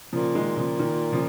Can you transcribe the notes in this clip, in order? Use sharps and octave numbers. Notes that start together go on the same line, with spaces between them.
A#2 C#3 F3
D#3 G#3
C#3 F3
D#3
C#3 F3